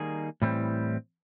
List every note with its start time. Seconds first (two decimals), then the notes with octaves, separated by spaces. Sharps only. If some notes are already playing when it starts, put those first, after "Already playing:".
Already playing: D#3 G3 A#3 D#4 G#4
0.42 A2 E3 G3 C4